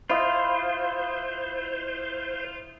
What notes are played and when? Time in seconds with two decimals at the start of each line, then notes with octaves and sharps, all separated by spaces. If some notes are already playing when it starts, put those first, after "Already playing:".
0.09 E4 F4 C5 D#5